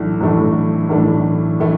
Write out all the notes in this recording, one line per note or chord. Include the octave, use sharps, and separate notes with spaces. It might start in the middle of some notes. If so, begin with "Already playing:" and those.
Already playing: B1 A2 E3 A3 D4
B1 A2 E3 A3 D4
B1 A2 E3 A3 D4
A2 E3 A3